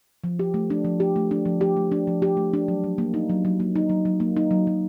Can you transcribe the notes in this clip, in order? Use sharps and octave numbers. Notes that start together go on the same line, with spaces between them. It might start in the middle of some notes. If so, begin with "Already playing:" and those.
F3
G4
A3
D4
F3
G4
A3
D4
F3
G4
A3
D4
F3
G4
A3
D4
F#3
F#3
A#3
D#4
F#3
F#3
A#3
D#4
F#3
F#3
A#3
D#4
F#3
F#3